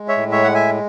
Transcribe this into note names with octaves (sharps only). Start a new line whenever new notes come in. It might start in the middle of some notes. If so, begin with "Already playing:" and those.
Already playing: G#3
C#5 E5
A2
C#5 E5
G#3 F#5
E5 G#5